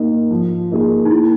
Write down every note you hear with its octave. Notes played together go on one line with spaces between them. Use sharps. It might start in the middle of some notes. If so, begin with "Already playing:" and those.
Already playing: A#3 D#4
F3
A#3 D#4 G#4
D#4
A#3 E4